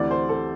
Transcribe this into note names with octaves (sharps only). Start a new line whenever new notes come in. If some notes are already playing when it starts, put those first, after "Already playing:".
Already playing: D2 C3 E3 D5
C5
A4